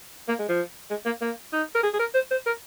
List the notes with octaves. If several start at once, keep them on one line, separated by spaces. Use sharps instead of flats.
A#3
G#3
F3
G#3
A#3
A#3
D#4
A#4
G#4
G#4
A#4
C5
C5
A#4